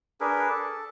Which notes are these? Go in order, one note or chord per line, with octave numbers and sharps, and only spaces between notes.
D4 G#4 A#4 B4
A4